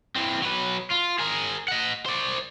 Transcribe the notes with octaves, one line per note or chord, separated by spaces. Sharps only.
E3 C4
F#3 B4
F4
G#4 A#4
D#5 F#5
C5 D5